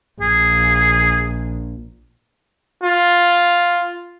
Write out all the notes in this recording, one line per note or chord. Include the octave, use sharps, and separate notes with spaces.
A#1 G#4
F4